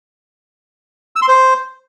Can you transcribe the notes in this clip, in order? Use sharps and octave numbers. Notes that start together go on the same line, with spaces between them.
E6
C6
C5